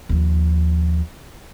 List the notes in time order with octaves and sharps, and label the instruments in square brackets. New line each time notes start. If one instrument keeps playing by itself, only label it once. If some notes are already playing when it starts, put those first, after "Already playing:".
[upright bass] D#2 F3